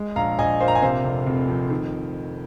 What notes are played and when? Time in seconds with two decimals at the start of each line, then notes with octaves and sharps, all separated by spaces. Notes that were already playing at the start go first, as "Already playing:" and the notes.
Already playing: G#3
0.16 A#1 F5 A#5
0.38 A#1 D#5 G#5
0.60 A#2 C5 F5
0.68 A#5
0.75 G#5
0.82 C3 C5 F5
1.04 F1
1.27 F1
1.48 F2
1.71 D#3